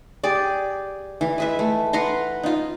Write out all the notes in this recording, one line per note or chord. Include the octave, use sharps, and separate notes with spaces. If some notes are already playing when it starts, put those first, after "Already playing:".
G4 G#4 D5
E3
G#3 B4 E5
A3
B4 F#5 A#5 C6
D#4 F4